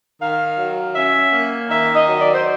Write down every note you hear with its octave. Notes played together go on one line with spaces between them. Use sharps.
D#3 F5
F#3
C#4 E5
A#3
D#3 E5
D#5
F#3
D5
C5